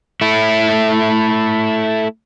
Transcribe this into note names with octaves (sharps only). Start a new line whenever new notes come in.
A3 E4